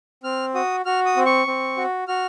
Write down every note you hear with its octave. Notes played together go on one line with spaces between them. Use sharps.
C4 F6
F#4 D#6
F#4 F6
D#6
C4
C#6
C4
F#4
F#4 F6